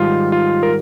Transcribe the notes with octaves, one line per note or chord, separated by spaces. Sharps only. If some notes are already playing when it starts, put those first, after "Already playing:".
Already playing: G#2 D#3 G3 F4
F4
A#4